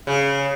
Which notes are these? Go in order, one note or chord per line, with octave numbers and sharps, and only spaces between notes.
C#3